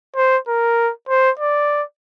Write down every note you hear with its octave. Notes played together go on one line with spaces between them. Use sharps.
C5
A#4
C5
D5